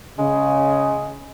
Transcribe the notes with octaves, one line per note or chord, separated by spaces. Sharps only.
C#3 G#3